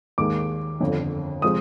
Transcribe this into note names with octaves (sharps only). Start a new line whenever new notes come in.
D#2 D#3 G#3 D6
G1 F2 D3
C3 F3 G#3 D#6